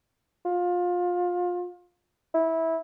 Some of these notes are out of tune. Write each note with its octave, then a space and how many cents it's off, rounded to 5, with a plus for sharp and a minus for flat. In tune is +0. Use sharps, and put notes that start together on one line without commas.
F4 +25
E4 -15